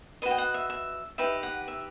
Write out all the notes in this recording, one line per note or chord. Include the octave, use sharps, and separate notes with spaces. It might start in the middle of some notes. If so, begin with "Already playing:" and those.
F#4 B4 D#5
G5
F#5
E5
E5
D#4 G4 B4 E5
F#5
E5